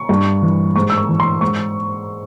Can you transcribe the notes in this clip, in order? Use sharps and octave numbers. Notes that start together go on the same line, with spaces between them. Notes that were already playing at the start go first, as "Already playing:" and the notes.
Already playing: C#6
G2
E3
G#2 C#6
E6
C#6
E3
C6
G#2 C#6